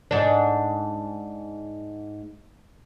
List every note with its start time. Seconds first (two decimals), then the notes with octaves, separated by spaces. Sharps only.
0.11 G#2 D4